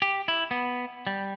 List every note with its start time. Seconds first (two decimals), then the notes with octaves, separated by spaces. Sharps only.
0.02 G4
0.28 E4
0.51 B3
1.07 G3